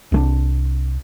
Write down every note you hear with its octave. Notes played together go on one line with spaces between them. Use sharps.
C2 G#3 D4